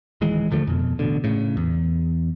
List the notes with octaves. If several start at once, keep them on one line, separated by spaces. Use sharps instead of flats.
D1 D#3 E3 G#3
D#2 D3 F3 A3
F2 B2
A1 B2 D3
A2 C#3
E2